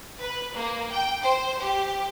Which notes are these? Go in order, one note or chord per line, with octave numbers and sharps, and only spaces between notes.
B4
A#3
G5
C5
G4